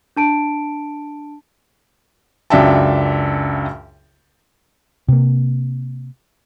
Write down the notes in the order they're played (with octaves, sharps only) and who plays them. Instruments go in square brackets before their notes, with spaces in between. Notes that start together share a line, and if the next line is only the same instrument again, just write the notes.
[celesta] D4 A5 D7
[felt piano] C#2 F#2 D4 E5 G5 A5
[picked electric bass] C3 A#3